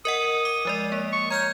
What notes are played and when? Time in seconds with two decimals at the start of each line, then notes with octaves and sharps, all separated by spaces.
0.05 A#4 D#5 F#5 D#6
0.45 D6
0.65 F3 G#3 D5
0.92 A#3
1.12 C#6
1.30 C#5 A#5 F6 G6